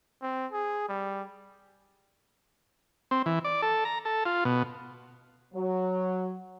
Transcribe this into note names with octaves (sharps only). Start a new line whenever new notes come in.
C4
G#4
G3
C4
E3
D5
A4
A#5
A4
F4
B2
F#3